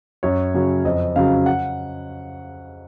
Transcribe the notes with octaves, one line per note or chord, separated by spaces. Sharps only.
F#2 C#5
C#3 F#3 C#4
F2 D#5
C#3 F#3 F5
F#5